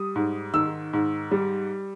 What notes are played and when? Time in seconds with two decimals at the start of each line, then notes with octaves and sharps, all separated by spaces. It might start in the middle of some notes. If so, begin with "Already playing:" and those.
Already playing: G3 D#6
0.16 G#2
0.54 D#3 E6
0.93 G#2
1.31 G3